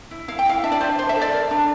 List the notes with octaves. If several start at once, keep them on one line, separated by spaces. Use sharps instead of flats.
E4
E4 F5
G5
E4 F5
D4 E5
D5
D4 C5
D4 C5
E5
A4
D5
A#4
D4